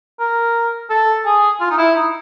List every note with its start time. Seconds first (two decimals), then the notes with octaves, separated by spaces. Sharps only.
0.20 A#4
0.90 A4
1.25 G#4
1.61 F4
1.70 D#4
1.78 E4
1.95 D#4